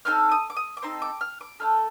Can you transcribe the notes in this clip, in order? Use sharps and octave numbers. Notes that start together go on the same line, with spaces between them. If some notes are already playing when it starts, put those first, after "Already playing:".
C4 D#4 A4 F6
D#6
D6
D#6
D6
C4 D#4 A4 C6
D6
F6
D6
A3 D#4 A4 F6